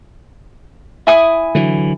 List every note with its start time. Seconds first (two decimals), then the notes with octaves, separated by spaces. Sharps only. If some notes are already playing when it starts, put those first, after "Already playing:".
1.07 E4 G#5 D#6
1.55 D3 E3 F#3